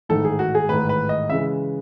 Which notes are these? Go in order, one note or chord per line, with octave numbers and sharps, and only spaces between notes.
A1 G#2 D#3 A3 A4
G#4
F#4
G#4
A1 G#2 D#3 A3 B4
B4
D#5
C#3 E3 G#3 E5